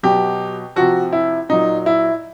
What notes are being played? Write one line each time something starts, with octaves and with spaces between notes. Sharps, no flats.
B2 F#3 G4
C3 F3 F#4
E4
A#2 F#3 D#4
E4